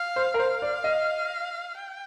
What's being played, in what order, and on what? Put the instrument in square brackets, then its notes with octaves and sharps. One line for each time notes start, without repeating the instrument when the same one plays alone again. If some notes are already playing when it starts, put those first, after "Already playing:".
Already playing: [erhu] F5
[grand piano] C5
A#4
[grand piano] C5 [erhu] F5
[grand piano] D5
D#5
[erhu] G5